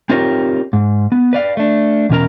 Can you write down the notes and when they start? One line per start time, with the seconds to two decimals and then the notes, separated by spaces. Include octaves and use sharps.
0.10 C4 D#4 F4 G4 A#4 C#5
0.73 G#2
1.12 B3
1.33 B4 D5 F5
1.57 A3 D4
2.10 E2 B2 C#4 A#4 A#5